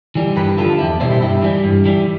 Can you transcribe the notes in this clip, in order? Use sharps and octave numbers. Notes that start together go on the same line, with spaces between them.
E3 G3
G2 G4 B4
D3 F3 F4 A4
E2 E4 G4
B2 G3 C5 E5
E4 G4
G2 E4 G4
E3 G3
G2
E3 G3